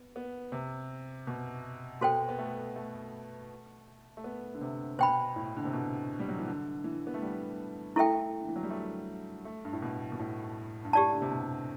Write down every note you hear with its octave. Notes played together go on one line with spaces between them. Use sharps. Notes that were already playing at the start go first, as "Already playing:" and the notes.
Already playing: B3
B3
C3
B2
B2 F#4 A4 C5 G5
B3
A3
A3
A3
B3
D3
C3
B2 C5 G5 B5
A2
D3
C3
B2
G3
F#3
E3
D3
E3
B3
A3
G3
A3 E4 A4 E5 G5
D3
E3
F#3
G3
A3
A3
G2
A2
B2
B2
A2
G2
A2 G4 D5 A5
D3
C3
B2